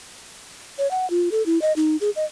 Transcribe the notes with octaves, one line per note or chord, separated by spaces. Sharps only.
C#5
F#5
F4
A4
E4
D#5
D#4
G#4
D#5